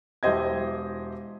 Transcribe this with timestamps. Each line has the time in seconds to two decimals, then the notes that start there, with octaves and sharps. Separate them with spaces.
0.23 E1 E4 G4 C5 D#5 G#6